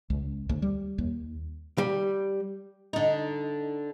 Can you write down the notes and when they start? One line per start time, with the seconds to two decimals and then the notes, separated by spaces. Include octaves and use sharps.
0.10 C#2
0.49 D2
0.62 G3
0.98 D#2
1.78 G3
2.93 D3 D#4